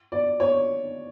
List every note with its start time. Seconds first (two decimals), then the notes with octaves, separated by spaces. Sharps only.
0.12 D5
0.40 C#5